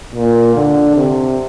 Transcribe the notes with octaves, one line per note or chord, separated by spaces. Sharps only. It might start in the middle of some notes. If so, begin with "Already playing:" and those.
A#2
D3
C3